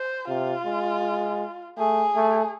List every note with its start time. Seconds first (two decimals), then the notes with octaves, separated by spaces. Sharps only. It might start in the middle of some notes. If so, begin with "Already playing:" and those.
Already playing: C5
0.28 C3 F4
0.66 G#3
1.78 A3 G#4
2.16 A3